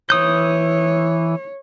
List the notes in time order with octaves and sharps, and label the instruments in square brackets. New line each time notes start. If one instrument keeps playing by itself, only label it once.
[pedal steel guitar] E3 D#6 G6 [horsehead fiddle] C#5